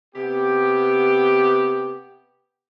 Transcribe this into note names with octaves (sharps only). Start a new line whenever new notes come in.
C3 B3 G4